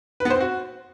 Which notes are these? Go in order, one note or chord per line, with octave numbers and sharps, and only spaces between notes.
B4
B3
C5
C4
F#4